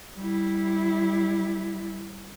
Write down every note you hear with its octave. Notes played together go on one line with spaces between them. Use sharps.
G3 E4